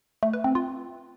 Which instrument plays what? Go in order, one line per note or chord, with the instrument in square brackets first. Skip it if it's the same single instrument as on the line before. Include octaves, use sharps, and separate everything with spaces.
[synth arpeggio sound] A3
B4
C4
F4